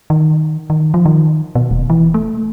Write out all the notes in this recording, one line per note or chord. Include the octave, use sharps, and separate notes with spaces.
D#3
D#3
F3
D#3
B2
D#1
E3
A3